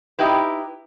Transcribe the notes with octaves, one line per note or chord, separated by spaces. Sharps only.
D#4 E4 G4 B4